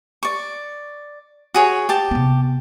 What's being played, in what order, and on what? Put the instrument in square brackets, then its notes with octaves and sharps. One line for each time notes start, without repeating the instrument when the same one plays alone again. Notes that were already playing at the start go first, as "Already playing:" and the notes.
[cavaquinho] D5 C#6
F#4 G#4 C#5
G4 A5
[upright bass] C3 B3